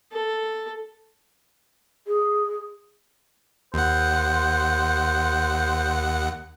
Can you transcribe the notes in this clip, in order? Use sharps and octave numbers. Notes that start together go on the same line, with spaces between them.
A4
G#4
D#2 C5 F#5